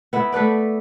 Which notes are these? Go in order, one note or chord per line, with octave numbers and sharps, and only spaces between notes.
B3 E4
A3 A4 B4 D5